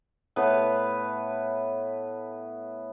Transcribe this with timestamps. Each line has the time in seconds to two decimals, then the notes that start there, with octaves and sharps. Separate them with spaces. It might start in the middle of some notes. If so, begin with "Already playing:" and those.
0.36 A2 B3 B4